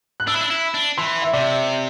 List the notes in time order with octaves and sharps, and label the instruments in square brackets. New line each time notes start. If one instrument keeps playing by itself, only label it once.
[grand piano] F#6
[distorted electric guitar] D4 [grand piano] E6
[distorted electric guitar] E4
D4
E4
D4
[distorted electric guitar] E3 [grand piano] C6
[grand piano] E5
[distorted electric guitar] C3 [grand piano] D5